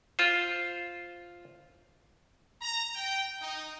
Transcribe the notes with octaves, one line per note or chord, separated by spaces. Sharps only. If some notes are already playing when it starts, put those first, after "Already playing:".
F4 C5
A#5
G5
D#4